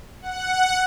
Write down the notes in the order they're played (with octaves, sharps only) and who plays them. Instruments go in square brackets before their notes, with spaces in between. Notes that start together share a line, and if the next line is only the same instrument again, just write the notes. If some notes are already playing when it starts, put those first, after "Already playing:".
[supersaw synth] F#5